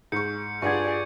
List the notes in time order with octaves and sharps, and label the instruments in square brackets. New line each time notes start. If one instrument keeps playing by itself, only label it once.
[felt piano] G#2 C#6 [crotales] G6 C#7
[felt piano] G2 F4 F#5 [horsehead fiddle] G#4 D5 [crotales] C#6 G#6